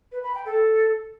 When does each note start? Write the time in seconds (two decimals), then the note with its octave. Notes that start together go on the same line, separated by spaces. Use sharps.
0.12 B4
0.23 B5
0.34 G5
0.46 A4